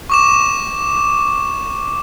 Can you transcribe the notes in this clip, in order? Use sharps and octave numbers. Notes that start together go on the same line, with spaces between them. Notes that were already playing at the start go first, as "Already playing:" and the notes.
C#6 D6 E7